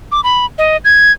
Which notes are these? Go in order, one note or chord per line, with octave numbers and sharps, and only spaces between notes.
D6
B5
D#5
G#6